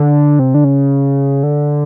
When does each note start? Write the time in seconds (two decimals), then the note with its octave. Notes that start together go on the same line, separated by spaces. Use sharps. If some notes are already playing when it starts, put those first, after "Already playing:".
Already playing: D3
0.39 C3
0.54 D3
0.64 C#3
1.43 D3